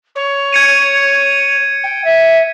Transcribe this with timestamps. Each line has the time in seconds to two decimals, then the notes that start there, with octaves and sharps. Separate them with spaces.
0.15 C#5
0.53 G#6 C#7 D#7
1.83 G5
2.04 E5